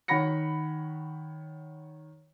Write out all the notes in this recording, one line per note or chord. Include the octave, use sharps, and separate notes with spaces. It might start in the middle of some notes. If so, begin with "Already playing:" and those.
D#3 C#5 F#5 B5 A#6 C#7